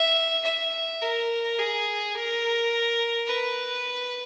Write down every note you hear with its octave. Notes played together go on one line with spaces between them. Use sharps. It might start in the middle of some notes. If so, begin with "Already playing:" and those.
Already playing: E5
E5
A#4
G#4
A#4
B4